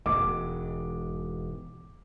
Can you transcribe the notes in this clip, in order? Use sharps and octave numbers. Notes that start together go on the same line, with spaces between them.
E1 G#2 D6